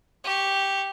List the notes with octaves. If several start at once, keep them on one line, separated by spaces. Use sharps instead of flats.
G4 C#6